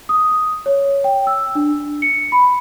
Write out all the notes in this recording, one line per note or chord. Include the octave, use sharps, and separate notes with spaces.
D#6
C#5
G5
E6
D4
C#7
B5